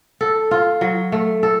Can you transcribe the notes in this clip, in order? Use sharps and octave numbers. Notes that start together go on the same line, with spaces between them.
A4
F4
F#3
A3
A4